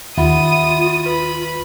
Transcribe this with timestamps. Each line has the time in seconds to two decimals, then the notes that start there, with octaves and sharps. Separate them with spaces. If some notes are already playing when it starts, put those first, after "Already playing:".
0.17 D#2 F4 E5 F#5 B5 D#6
1.06 B4 B5